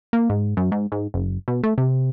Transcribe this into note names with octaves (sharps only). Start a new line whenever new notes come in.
A#3
G#2
F#2
G#2
G#2
F#1
B2
A3
C3